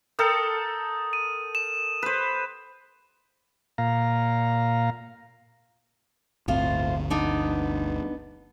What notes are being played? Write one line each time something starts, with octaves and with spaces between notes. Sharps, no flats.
A4 A#4 G5 D#6
D#7
E7
B4 C5
A#2 F5 A#5
G1 D2 A2 C4 F4 C5
B3 D4 D#4